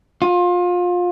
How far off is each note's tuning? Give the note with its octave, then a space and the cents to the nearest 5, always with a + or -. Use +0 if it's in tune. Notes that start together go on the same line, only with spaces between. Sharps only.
F4 +25